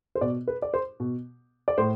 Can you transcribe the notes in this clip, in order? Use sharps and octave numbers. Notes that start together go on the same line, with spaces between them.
C5
B2 D5
B4
D5
C5
B2
D5
A2 C5